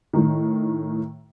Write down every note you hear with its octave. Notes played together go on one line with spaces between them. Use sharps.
A2 D#3